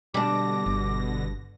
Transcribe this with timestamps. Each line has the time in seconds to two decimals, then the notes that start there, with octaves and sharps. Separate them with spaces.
0.14 B2 D3 G3 D4 D6 A#6
0.66 G1